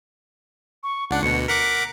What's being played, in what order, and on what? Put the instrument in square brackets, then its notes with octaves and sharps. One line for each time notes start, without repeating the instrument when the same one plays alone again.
[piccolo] C#6
[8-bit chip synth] C#2 D4 [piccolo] F#5
[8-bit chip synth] D2 B2 [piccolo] C#7
[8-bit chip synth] A#4 F#5 D6 [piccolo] B6